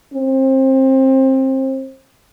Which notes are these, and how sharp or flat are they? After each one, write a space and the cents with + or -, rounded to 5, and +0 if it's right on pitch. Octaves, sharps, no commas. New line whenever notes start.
C4 +25